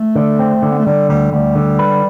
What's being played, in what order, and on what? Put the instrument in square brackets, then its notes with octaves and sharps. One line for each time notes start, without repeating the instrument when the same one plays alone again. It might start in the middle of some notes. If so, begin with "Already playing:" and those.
Already playing: [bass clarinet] A3
[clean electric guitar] D3
C4
D3
[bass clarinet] B3
A3
[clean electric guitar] D3 [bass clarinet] G3
[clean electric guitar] D2 [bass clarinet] G3
[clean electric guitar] D2 [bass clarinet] G3
[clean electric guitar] D3
B4